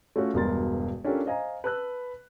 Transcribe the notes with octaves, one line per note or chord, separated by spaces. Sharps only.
A3 C#4 F4 F#4
E1 G2 B2 A#4 C6 A6
C#4 D4 F4 G4 A4 A#4
C5 D#5 F5 G#5 A#5
B4 A5 B5 E6 F#6